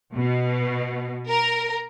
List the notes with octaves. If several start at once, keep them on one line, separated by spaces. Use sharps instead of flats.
B2
A#4